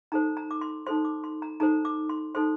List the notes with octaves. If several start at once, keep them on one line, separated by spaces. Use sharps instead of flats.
D#4 A4 C5 A#5
A#5
D6
C6
D#4 A4 C5 C6
D6
C6
A#5
D#4 A4 C5 A#5
D6
C6
D#4 A4 C5 C6